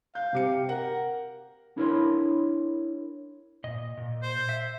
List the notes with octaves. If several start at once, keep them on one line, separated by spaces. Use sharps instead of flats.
F5 G6
C3 G4 C#7
A#4 F#5
D4 E4 A#4 C#5 B5 C6
A#2 D#5
A#2
C5
E5